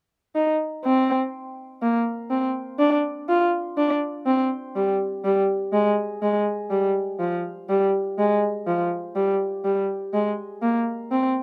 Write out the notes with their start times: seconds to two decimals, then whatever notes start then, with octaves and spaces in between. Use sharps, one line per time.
0.35 D#4
0.84 C4
1.82 A#3
2.30 C4
2.79 D4
3.29 F4
3.77 D4
4.26 C4
4.76 G3
5.24 G3
5.73 G#3
6.22 G#3
6.71 G3
7.20 F3
7.69 G3
8.18 G#3
8.67 F3
9.16 G3
9.65 G3
10.14 G#3
10.62 A#3
11.11 C4